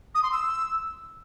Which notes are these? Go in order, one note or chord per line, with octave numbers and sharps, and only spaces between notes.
D#6
C6
E6